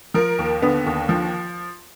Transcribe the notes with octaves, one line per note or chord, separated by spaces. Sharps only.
F3 A#4
D#2
D3 B3
D#2
F3